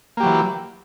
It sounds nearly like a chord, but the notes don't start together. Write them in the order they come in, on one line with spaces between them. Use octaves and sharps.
A#3 G4 F#3 E3